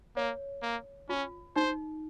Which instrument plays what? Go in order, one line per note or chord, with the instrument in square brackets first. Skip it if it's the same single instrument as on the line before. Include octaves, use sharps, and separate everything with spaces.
[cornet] A#3 [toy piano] C#5
[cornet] A#3
[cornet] C#4 [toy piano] F4
[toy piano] D#4 [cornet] C5